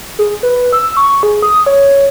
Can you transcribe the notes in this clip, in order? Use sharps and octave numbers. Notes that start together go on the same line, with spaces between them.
G#4
B4
E6
C#6
G#4
D#6
C#5